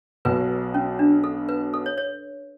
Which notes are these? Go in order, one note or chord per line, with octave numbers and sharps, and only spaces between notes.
B1 B2 F#3 B4
C#4
D4
A4
B4
A4
C#5
C#5